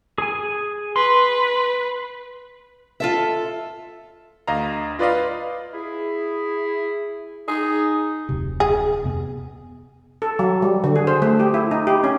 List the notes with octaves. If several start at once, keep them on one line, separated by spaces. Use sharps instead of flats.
G#4 G#5
B4 C6
F4 A4 E5
D2 D#5 F5 A#5
F4 B4 D5 D#5 F5
E4 G#4
D#4 G#4
D1 F2 C3
G#4
F2 C3 B3
A4
F#3
G3
D3
G#4
C5
A3
G4
E4
D#4
G4
C#4